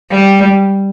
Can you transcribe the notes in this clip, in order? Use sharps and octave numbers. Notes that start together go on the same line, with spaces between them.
G3